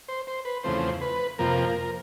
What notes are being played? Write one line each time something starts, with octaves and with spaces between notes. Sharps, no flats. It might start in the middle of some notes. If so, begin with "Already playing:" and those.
C5
C5
B4
E2 C#3 F3 A3 C4 C5
B4
F2 C3 F3 A#3 A#4